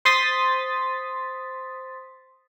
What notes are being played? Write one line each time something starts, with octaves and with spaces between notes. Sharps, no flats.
C5 C6 D#6 A6 B6